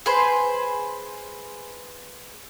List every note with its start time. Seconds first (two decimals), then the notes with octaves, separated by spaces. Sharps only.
0.06 G#4 B4 C5